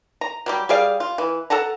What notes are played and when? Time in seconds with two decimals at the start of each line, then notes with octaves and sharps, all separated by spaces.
0.21 A#5
0.46 F#3 G3 G4
0.69 G3 G#4 D5 F5
1.00 F4
1.18 E3
1.50 A4 F#5 A5 A#5